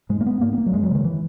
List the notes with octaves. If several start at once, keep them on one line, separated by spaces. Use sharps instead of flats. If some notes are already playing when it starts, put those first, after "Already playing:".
G#2 G#3
A#3
B3
G#2 A#3
B3
A#3
F#3
F#2 G#3
F#3
C#3
D#3
E3